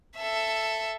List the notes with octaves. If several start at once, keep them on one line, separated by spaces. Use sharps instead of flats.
A4 E5